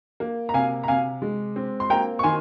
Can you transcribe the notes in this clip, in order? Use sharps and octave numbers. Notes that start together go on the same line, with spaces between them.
A#3
A#5
C3 F5 G#5
A#5
C3 F5 G#5
G#3
C4
C6
A#3 G5 A#5
C#6
D#3 G#5 C6